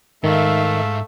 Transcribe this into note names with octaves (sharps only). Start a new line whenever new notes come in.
G#2 D#3 A3 E5 F5